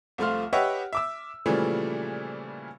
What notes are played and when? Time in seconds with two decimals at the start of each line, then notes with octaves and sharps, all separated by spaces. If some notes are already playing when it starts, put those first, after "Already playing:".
0.18 C2 F3 A3 F4 C6 F6
0.53 G4 B4 C#5 D#5 E5 F#5
0.93 E5 D6 E6
1.46 A#2 C#3 E3 F3 G3 A3